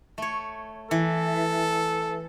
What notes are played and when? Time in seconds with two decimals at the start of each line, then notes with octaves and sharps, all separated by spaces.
0.18 A3 C#5
0.91 E3 A4